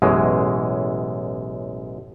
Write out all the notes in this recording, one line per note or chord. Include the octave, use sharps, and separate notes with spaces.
A1 F#2 B2 E3 G#3